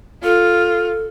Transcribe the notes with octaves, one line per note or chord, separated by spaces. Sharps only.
F4 A4